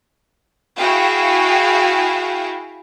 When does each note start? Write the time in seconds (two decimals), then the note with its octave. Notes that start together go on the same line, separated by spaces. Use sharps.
0.77 E4 F#4 G#4 F5 G5